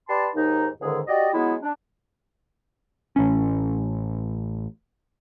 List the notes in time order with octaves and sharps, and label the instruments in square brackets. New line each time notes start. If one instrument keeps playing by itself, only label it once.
[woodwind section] G4 B4 D5 A5 C6
D#2 G#2 D#4
C#2 G#2 D3 D#3 G#4
F#4 G4 D5 D#5
F#3 G#3 B3 E4
D4
[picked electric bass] A1 C#4